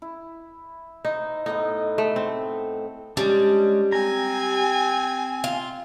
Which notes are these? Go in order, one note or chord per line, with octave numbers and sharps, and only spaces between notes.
E4
D#4 C5
A2 B3 D#4 D#5
A3
C4
G3 G#3 C#4 D4
C4 G#5 A#5
F4